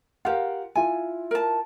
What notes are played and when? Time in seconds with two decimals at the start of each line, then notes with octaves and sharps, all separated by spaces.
0.25 F4 G4 A#4 F5 F#5
0.75 E4 F4 G#5
1.31 A#4 A5